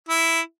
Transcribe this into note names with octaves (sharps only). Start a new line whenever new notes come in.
E4